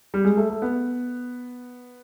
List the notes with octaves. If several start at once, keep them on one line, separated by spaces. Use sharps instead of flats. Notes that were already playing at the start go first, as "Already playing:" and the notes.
G3
G#3
A3
A3
B3